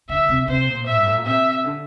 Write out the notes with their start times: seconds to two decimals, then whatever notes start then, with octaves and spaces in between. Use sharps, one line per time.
0.09 D3 E5
0.29 C3
0.48 C3 C5
0.67 A#2
0.87 A2 E5
0.96 G2
1.06 A2
1.16 A#2
1.25 C3 E5
1.64 D3